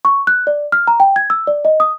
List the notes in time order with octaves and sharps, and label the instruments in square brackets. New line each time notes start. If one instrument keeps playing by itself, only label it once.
[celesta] C#6
F#6
D5
F6
A#5
G5
G#6
E6
D5
D#5
D#6